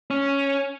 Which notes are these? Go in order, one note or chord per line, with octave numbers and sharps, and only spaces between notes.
C#4